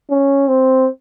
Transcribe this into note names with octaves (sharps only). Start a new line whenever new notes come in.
C#4
C4